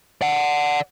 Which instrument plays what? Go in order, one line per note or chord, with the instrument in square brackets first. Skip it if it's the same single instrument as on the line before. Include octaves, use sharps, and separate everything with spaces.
[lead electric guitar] D5 F#5